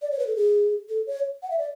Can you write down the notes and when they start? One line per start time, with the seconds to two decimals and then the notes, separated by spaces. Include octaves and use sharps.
0.02 D5
0.11 C#5
0.19 B4
0.27 A4
0.36 G#4
0.90 A4
1.07 C#5
1.43 F#5
1.50 E5
1.59 D5